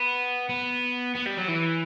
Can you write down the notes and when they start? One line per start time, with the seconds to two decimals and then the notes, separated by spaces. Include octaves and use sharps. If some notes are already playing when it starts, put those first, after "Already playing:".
Already playing: B3
0.49 B3
1.15 B3
1.26 G3
1.37 F#3
1.48 E3